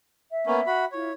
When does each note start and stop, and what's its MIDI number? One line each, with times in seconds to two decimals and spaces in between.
0.30 0.85 76
0.47 0.60 58
0.47 0.60 59
0.47 0.60 61
0.67 0.85 66
0.67 0.85 83
0.92 1.09 64
0.92 1.09 65
0.92 1.13 73